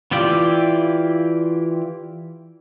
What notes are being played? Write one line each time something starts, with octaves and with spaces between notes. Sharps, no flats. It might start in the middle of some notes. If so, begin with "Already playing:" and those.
E3 E4 F4 G4 D5